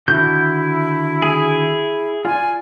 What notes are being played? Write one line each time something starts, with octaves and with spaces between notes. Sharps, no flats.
D3 D#3 E4 F#4 G6
G#4
F4 D5 G#5